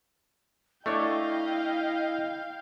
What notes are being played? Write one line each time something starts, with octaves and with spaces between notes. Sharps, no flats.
A3 D4 E4 C#5 D#5 F5 G5